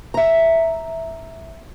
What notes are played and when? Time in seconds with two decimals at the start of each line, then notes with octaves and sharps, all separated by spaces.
0.14 E5 A#5